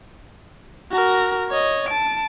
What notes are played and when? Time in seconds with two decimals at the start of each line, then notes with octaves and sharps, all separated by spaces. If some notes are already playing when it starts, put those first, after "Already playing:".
0.91 F#4 A#4
1.49 C#5 D#5
1.89 A5 D7